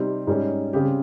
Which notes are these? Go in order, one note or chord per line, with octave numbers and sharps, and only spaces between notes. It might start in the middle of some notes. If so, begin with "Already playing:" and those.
Already playing: C3 G3 C4 D#4
G#2 G3 C#4 G#4
C#3 G3 C4 G4